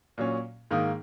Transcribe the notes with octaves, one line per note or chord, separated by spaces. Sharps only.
A#2 F#3 C#4
G#2 D#3 A#3 D#4